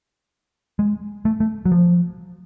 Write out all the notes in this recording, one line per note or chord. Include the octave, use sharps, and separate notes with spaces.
G#3
A3
A3
F#3
F3